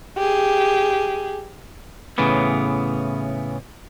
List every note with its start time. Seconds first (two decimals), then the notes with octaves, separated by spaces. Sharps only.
0.18 G4 G#4
2.18 A2 C#3 E3 B3